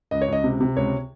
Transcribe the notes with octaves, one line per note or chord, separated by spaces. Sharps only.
C#2 D#5
C#5
C#2 D#5
C3
C3
C#2 C#5